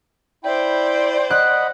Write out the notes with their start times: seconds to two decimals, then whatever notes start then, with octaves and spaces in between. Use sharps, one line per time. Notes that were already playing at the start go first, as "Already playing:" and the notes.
0.44 E4 C5 D5 G5 B5
1.31 D#5 F#5 B5 F#6